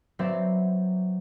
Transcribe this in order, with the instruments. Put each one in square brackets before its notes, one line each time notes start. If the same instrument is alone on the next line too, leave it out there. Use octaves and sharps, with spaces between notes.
[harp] F#3 C4 B4 C5 D5 E5